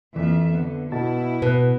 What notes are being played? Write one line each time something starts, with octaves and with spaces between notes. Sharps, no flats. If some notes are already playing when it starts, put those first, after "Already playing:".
F2 E3 A#3 E5
D3 B3
B2 E4 A5
B2 B4 F#6